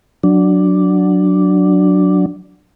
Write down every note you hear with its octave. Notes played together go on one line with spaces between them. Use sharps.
F#3 D4